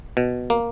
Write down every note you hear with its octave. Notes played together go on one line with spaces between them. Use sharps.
B2
A#3